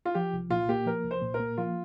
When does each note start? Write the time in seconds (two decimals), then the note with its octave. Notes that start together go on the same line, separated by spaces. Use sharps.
0.05 F4
0.15 F3 G4
0.34 C2
0.50 A#2 F4
0.69 A#3 G4
0.86 F3 A#4
1.04 C2
1.11 C5
1.22 A#2
1.34 A#4
1.40 A#3
1.57 F3 F4